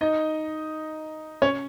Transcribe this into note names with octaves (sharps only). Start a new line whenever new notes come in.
D#4 D#5
C#4 C#5